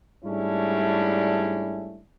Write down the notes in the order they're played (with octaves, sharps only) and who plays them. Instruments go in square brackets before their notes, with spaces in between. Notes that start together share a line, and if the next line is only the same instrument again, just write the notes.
[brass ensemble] G#2 G3 A3 C#4 D4 E4